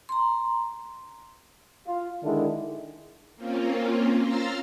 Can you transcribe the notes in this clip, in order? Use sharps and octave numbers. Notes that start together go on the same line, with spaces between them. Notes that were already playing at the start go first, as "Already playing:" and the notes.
A#5 C6
F4
D3 D#3 G#3 D4 E4
A#3 C4 C#4 F4
A#5 C6 E6 F6 A6 C7